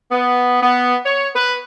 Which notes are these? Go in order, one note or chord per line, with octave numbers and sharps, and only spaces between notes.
B3
B3
C#5
B4